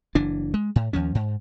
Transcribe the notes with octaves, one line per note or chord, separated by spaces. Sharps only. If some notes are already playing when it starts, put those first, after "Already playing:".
F#1 E3 D4
G#3
A2
D#2 F3 C#4
G#2